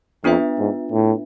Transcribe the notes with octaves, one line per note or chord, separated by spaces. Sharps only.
F2 B3 D4 F4 B4 E5
G#2
A2